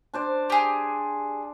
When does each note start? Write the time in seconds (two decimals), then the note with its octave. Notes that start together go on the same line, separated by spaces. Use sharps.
0.14 D4 C5 D5
0.50 G4 G#4